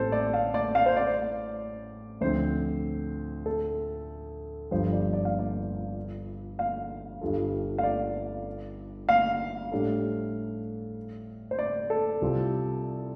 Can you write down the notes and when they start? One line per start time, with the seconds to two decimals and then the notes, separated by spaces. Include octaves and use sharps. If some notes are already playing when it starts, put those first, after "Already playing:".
Already playing: A1 A2 G3 C4 A4 C5
0.12 D5
0.34 F5
0.54 D5
0.75 F5
0.86 C5
0.97 D5
2.21 D2 D3 F3 C4 C5
3.46 A4
4.71 G1 G2 F3 C5
4.93 D5
5.13 D5
5.25 F5
5.39 D5
6.59 F5
7.21 G1 G2 G3 F4 A4
7.78 F5
7.83 D5
9.09 F5
9.72 A2 G3 D4 A4
11.51 C5
11.59 D5
11.90 A4
12.21 C2 C3 G3 C4 F4